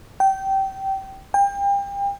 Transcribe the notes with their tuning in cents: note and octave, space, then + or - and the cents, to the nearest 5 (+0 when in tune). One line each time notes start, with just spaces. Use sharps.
G5 -20
G5 +35